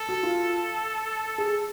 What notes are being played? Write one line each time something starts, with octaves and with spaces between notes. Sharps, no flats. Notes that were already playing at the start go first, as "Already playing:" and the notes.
Already playing: A4
F#4
F4
G#4